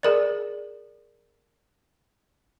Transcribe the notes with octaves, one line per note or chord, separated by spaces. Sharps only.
G#4 A#4 D5